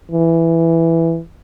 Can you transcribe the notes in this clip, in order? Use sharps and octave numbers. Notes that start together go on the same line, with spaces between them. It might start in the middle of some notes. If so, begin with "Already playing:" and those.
E3